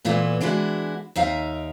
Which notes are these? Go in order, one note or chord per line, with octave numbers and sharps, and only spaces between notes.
D2 A#2 E3 B3 E4 F4
E3 G#3 D4 E4 F#4
D#2 D#4 E5 F5